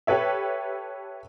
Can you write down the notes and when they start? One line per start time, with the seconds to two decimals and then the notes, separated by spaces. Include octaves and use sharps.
0.07 G4 A4 B4 C#5 E5